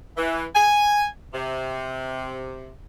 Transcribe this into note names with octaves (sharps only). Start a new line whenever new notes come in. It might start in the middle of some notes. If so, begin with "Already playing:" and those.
E3
G#5
C3